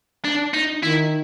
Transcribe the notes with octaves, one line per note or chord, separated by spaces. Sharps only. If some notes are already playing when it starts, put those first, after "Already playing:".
D4
D#4
D#3 E4